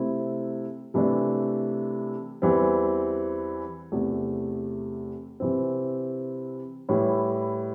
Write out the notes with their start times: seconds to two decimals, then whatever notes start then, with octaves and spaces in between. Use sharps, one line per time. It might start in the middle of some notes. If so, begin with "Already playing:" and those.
Already playing: C3 A3 C4 E4
0.94 C3 E3 A3 D4
2.42 E2 E3 G3 C4
3.92 E2 C3 A3
5.40 C3 E3 C4
6.89 A2 E3 G3 E4